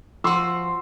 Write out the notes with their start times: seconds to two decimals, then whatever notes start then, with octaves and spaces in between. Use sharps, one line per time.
0.24 F3 F#4 C6 E6